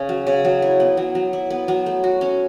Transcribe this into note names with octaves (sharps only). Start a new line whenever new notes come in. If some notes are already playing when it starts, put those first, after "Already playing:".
Already playing: C#3 C#4
F#3
C#3
F#3
E4
B3
F#3
F#3
E4
B3
F#3
A3
F#4
C#4